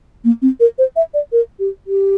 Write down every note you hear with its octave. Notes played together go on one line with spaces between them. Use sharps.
A#3
C4
A#4
C5
E5
D5
A#4
G4
G4